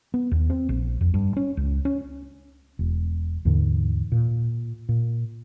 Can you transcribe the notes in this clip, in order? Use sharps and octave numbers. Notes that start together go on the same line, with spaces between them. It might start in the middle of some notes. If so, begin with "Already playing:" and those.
B3
D#2
C4
A#1
F2
G2
C#4
C#2
C#4
E1
D#2 G#2 D3 E3
A#2
A#2